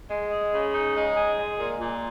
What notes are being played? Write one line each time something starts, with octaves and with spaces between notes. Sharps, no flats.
G#3
G#4
C#3
D#4
G#3
G#4
G#3
A#2
A#2